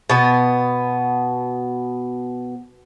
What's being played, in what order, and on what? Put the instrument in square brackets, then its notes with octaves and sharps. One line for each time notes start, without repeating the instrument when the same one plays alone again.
[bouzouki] B2 B3